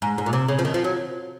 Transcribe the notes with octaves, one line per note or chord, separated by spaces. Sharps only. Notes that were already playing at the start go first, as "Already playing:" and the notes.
G#2
G#2
A#2
C3
C#3
F3
D#3
F3
F#3